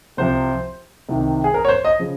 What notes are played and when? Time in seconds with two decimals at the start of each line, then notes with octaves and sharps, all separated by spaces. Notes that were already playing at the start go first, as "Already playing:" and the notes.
0.17 C2 C3 F3 C5
1.09 C2 C3 D#3
1.44 G#4
1.54 A#4
1.65 C#5
1.69 C5
1.85 D#5
1.99 C#3 F3